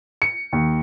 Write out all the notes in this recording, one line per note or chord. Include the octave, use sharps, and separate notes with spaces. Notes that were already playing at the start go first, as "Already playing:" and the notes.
C#7
D#2